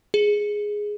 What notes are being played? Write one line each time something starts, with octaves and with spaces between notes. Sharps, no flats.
G#4